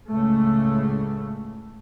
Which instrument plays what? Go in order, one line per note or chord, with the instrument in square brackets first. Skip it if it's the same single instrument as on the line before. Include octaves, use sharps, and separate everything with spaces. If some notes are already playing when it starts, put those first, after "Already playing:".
[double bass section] C#2 A2 C#3 A3